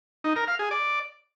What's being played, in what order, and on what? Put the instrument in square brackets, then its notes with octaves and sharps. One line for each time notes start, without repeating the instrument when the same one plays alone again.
[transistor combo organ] D#4
A#4
F5
G#4
D5